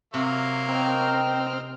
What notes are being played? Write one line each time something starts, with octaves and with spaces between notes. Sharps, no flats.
C3 F#3 A#3 F5
C4 A#4 D#5 G5 F6